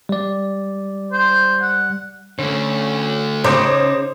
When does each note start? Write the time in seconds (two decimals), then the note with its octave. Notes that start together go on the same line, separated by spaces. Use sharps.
0.09 G3 D5
1.12 C5
1.62 F#5
2.39 D3 A3 C#4
3.44 C#3 D#4 C5 D6